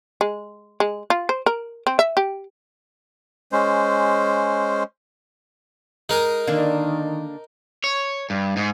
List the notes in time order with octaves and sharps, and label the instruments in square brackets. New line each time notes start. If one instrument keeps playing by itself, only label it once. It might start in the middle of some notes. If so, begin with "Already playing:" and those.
[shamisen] G#3
G#3
F4
C5
A#4
C4
E5
G4
[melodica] G#3 C#4 C5
[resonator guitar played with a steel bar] G#3 [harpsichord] D#4 A#4 D#6
[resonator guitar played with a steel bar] D3 A#3 D4 [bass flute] D#3
[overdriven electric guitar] C#5
G2
G#2